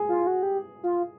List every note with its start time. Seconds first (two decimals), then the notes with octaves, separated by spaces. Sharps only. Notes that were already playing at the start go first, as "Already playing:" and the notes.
Already playing: G#4
0.09 F4
0.27 F#4
0.43 G4
0.83 F4